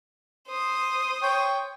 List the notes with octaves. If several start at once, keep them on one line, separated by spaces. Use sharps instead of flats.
C5 D#6
C#5 G5